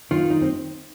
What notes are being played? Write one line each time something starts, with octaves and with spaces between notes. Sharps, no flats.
D#3 F4
D#4
C4